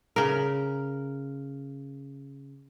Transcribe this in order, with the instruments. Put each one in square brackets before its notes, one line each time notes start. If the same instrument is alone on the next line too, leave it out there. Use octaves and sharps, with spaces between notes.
[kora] C#3 A#4